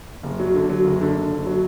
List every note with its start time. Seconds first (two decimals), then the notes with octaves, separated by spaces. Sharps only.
0.23 F#1
0.40 F#3
0.54 D3
0.69 F#3
0.85 F#1
1.01 D3
1.16 D3
1.32 F#1
1.46 F#3